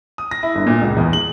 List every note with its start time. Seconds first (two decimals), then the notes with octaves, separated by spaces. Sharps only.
0.18 D#6
0.31 A#6
0.43 E4
0.55 G1
0.67 A#2
0.81 C#2
0.97 E2
1.13 F#7